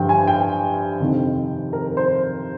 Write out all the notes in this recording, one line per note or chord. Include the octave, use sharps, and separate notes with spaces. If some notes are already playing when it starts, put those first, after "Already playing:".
Already playing: G2 D3 F3 G5
G#5
G5
F2 C3 D#3
A#4
C5